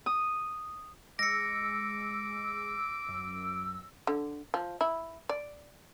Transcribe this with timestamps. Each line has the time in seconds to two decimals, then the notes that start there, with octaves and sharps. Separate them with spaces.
0.06 D#6
1.19 G#3 D6 E6 A#6 C#7
3.08 F#2
4.07 D3
4.54 F3
4.81 E4
5.29 D5